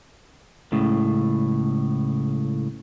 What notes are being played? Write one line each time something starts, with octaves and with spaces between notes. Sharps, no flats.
C#2 A2 C#3